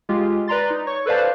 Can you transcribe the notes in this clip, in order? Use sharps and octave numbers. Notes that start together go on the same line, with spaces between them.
G#3 F4 G4
B4 D5 A#5 C6 A6
D#4
C#5 C#6
A4 B4 C5 D5 F5 A5